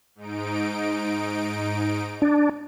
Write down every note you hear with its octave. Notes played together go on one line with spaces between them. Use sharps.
G#2 D#4 D7
D4